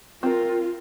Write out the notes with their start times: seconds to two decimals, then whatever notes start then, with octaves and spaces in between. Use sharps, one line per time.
0.23 C4 F4 A#4